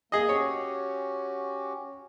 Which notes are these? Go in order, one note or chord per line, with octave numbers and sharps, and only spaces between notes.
A#3 G#4 D#5
C#4 F#4 G4 C#5